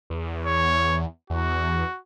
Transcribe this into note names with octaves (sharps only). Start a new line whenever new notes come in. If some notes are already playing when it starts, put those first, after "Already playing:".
E2
C#5
E2 F#4